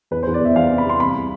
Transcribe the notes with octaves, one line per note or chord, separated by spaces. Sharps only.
E2 B4
E2 C5
D5
E2 E5
E2 F5
C3
B5
E2 C6
C2 B5